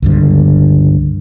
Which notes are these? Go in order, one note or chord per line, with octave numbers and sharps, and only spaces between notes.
C#2 G2 D3